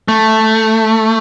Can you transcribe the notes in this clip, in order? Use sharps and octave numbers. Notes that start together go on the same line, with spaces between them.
A3